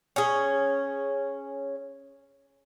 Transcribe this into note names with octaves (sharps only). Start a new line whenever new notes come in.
C#4 G#4